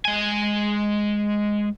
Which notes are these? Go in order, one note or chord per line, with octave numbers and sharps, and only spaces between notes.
G#3 G#5